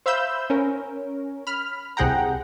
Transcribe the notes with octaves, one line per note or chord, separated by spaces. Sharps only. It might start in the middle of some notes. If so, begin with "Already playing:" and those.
C5 E5 F5 B5 E6 G6
C#4 A#4
B5 F6
C2 C3 G#4 F#5 G5 A#5